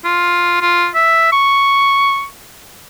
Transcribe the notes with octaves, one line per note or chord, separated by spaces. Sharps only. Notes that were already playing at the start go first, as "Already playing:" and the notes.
F4
F4
E5
C#6